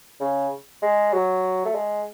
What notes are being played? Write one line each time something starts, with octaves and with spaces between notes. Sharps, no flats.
C#3
G#3
F#3
A3
G#3